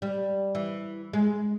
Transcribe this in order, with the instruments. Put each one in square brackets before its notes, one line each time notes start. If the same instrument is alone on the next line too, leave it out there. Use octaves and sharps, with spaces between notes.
[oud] G3
E3
G#3